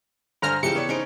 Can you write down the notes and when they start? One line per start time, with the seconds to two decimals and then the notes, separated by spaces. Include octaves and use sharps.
0.42 G2 D3 C5 G#5 A#5 F6
0.63 G2 C#3 E3 F3 A3 G4 A4 C#7
0.75 B3 C#5 D5
0.89 C#4 D#4 C5 D#5 D7